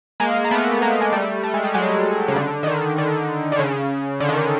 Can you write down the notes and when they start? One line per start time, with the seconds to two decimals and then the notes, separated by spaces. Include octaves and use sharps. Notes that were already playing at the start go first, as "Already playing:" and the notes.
0.20 G#3 A#3
0.45 A#3
0.51 A3 B3
0.72 B3
0.82 G#3 A#3
1.01 G#3
1.12 G3 A3
1.43 A3
1.54 G#3
1.64 G3
1.74 F#3 G#3
2.28 C#3
2.36 D3
2.63 D#3
2.67 D3
2.98 D3
3.52 D3
3.59 C#3
4.20 D3
4.29 D#3
4.37 D3